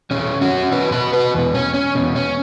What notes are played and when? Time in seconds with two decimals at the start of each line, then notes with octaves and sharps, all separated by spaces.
0.11 E2 B2 C#4
0.41 C#4 F#4
0.72 E2 B2 F#4 B4
0.92 F#4 B4
1.13 F#4 B4
1.34 E2 B2
1.54 C#4
1.74 C#4
1.95 E2 B2
2.16 C#4